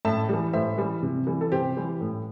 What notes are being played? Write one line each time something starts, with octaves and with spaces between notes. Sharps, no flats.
A2 E5 A5
E3 G3
A2 C5 E5
E3 G3
C3
E3 G3
A4
C3 G4 C5
E3 G3
A2